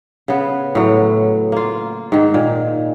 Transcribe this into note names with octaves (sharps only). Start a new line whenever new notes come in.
C#3 B3
A2 F#3
A#3 F4
G#2 D#3
A#2